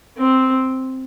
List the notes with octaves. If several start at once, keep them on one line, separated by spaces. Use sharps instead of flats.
C4